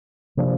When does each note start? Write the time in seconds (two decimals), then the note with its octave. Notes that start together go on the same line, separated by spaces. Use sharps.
0.37 C3 F3 A#3 D4